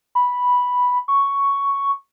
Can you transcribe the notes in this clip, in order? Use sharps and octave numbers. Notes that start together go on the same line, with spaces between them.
B5
C#6